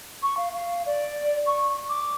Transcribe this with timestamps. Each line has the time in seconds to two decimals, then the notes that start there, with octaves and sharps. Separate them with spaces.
0.22 C#6
0.37 F5
0.53 F5
0.86 D5
1.46 C#6
1.89 D6